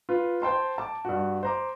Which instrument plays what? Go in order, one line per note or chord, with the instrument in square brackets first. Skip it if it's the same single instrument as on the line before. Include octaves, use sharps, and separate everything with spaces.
[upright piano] F4 B4
C5 G5 A5 C6
A5 D6
G2 F#4
C5 A#5 D6